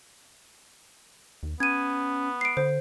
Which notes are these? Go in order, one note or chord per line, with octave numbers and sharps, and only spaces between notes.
D#2
B3 C#4 G#6 D#7
C7 D7
D3 C5